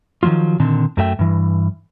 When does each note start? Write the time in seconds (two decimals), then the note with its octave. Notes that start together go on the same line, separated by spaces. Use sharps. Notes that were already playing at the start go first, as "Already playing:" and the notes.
0.23 D#3 F3 F#3 G#3 F4
0.60 A#2 D3 D#3 C4
0.97 F#2 F#3 A3 E5 G5
1.19 G2 E3